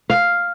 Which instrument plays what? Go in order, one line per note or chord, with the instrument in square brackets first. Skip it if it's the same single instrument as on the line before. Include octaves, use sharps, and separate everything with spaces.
[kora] F5